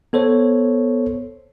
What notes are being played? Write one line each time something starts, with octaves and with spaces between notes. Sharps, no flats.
B3 A4 C5 C#5